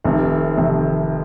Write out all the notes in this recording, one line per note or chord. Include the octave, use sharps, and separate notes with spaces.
F1 F2 C3 D#3
F1 F2 C3 D#3